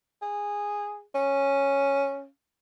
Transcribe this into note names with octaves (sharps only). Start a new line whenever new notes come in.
G#4
C#4